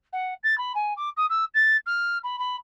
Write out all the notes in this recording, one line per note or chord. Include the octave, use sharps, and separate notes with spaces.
F#5
A6
B5
G#5
D6
D#6
E6
A6
F6
B5
B5